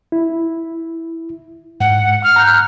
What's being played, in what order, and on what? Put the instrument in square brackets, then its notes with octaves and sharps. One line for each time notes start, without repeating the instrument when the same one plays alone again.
[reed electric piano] E4
[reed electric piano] G#2 [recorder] F#5
[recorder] F6
[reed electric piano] A#5 F#6 G6